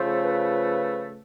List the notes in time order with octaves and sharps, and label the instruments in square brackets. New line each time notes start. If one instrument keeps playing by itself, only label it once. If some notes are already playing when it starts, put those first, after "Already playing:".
Already playing: [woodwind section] C#3 F3 A3 C5
B4